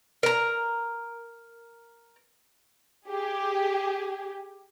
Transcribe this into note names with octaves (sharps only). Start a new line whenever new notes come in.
A#4 A#5
G4 G#4